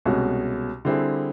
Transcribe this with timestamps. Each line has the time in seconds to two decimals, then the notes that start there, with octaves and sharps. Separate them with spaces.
0.05 C2 B2 G#3 C#4 F#4
0.85 D3 G3 C4 E4 G#4